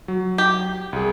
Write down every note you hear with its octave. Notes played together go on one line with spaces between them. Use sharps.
F#3
G4
C2 G#4